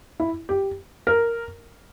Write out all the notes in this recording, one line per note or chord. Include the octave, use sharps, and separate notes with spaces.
E4
G4
A#4